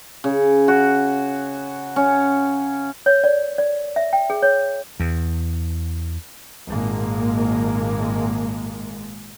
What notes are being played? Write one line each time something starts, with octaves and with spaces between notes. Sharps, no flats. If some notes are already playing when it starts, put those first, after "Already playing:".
C#3
F#4
C#4
C#5
D5
D5
E5
G5
G#4
C#5
E2
G#1 A#2 G#3 A#3